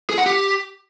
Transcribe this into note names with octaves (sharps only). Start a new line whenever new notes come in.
G#4
F#5
G4